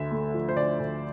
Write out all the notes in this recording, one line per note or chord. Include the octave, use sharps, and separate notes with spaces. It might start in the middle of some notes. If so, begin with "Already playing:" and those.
Already playing: D2 D3 E5
A3
F3
C5
D3 D5
D2